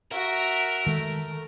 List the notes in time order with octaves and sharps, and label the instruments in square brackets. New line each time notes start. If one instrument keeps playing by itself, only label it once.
[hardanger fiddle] F#4 E5 [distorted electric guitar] A#4
[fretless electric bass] D#3 G#3 [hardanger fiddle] A3